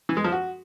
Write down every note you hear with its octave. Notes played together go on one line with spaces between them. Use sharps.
E3
G#3
F3
F#4